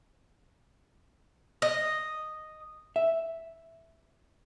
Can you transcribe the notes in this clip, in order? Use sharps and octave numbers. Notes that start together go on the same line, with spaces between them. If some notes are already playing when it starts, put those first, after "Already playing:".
D#5
E5